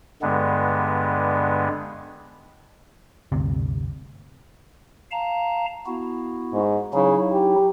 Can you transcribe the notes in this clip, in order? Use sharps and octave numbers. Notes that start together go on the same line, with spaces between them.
G2 D3 G#3 B3
G1 D2 C3
F5 A5 A#5
B3 E4 F#4
G#2
C#3 F#3 D#4 E4
G4